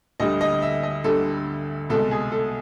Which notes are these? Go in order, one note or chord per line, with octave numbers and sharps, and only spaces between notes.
D2 D3 G3 D#5
D#5
E5
D#5
D2 D3 G3 A4
C2 B2 G#3 A4
G#4
A4